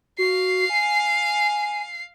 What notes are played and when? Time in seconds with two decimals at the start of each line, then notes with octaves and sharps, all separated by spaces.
0.18 F#4 F5 C7
0.70 G#5